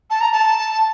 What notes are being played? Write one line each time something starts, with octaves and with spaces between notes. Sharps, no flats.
A5
A#5
A5